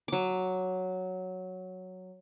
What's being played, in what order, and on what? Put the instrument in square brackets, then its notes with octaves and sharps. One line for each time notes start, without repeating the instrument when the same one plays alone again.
[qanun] F#3 D6